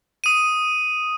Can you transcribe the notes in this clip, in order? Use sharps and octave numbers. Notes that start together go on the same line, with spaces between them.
D#6 D#7